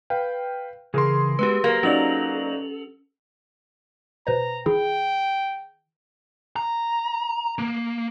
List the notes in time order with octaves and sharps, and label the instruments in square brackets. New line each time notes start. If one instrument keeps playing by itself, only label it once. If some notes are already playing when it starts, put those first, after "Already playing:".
[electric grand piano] B4 F5 G5
[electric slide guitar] C#3 E3 [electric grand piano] G#4 A#4 C6
[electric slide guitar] G#3 B3 F#4 [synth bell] G4 B4
[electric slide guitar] F#3 [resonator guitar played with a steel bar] A#3
[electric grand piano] F#3 D#4 D5 [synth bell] C#4 F7 F#7 [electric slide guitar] A4
[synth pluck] B2 B4 C5 [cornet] A#5
[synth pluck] D#3 E4 G#4 [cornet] G5
[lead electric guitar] A#5
A#3